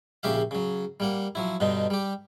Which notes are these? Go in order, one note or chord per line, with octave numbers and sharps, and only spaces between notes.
A#1 C#3 G4 E5 F5
C#3 F#3
G3 A#3 F#5
F3 F#3 E4
G2 B2 D3 D#4
G3 G4